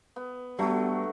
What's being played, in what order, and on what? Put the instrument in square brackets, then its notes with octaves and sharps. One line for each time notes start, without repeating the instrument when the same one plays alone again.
[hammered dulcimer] B3
[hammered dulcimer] D3 F#3 A3 [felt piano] G3 [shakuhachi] B3